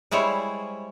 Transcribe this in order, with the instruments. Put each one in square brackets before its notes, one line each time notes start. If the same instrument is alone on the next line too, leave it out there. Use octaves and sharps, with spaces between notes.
[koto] G3 G#3 E4 C5 C#5